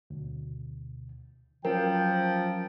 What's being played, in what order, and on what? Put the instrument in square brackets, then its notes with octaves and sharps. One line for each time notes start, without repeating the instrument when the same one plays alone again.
[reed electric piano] D2 B2
[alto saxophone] F3 [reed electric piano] F#3 C#4 [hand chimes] A#4 [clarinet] G5